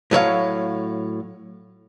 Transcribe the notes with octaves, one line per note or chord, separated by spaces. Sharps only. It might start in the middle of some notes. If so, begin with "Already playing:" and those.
A2 F#3 C#5 F5